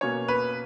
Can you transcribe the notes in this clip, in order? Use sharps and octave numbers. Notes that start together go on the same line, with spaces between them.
B2 A#3 C#4 C#5
B4